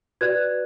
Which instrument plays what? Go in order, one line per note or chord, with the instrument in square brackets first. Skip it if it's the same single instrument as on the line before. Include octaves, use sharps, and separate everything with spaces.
[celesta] F#4 B4 D5 F#6 G#6